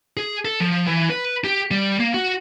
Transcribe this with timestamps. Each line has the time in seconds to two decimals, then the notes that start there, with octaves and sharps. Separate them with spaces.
0.17 G#4
0.45 A4
0.60 F3
0.87 E3
1.10 B4
1.44 G4
1.71 G3
2.00 A#3
2.14 F#4